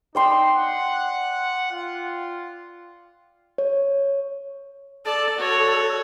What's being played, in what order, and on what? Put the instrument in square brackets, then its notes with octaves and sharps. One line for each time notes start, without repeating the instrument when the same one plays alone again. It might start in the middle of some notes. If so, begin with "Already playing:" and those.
[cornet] D#4 [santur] D5 G5 C6
[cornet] F#5
F4
[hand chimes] C#5
[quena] A4 [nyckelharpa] D5 A5
[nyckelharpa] F#4 C#5